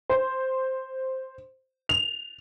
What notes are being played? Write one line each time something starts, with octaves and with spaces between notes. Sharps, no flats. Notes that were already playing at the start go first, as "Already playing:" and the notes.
C5
F7